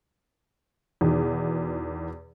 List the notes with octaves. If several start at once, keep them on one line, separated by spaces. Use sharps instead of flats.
E2 B2 D#3